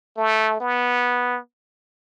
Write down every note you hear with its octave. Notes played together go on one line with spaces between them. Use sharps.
A3
B3